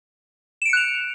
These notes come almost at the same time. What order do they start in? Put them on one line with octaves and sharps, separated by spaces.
E7 D7 C#7 F#6 F7